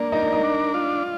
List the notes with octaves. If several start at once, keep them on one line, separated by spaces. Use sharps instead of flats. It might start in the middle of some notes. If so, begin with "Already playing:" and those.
Already playing: A#3 D4
D#4 A#4
D4
D#4
D4
F4